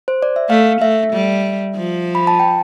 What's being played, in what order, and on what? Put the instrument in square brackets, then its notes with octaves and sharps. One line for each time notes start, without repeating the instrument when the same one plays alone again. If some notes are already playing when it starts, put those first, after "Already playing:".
[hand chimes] C5
D5
E5
[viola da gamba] A3 [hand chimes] F5
[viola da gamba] A3 [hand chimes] E5
[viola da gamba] G3
F3
[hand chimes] B5
A5
G5